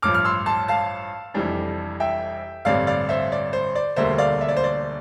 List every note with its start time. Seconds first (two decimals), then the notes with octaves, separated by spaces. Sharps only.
0.02 A1 G2 F3 D6 F6
0.14 F6
0.25 C6 E6
0.46 A5 C6
0.68 F5 A5
1.34 F1 F2 E3 G3 D4
2.00 E5 G5
2.65 A1 G2 D3 G3 C4 D5 F5
2.87 D5 F5
3.09 C5 E5
3.32 D5
3.53 C5
3.75 D5
3.96 E1 D2 D3 G3 A#3 C5 E5
4.18 D5 F5
4.41 E5
4.48 D5
4.56 C5
4.64 D5